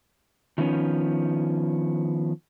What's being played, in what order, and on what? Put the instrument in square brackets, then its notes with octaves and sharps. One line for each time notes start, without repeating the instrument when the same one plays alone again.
[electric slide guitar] D#3 F3 B3 C#4